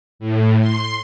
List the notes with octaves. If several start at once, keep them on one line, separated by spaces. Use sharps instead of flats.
A2
C6